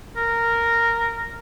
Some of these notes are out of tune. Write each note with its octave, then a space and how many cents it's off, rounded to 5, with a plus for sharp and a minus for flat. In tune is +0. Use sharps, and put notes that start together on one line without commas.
A#4 -10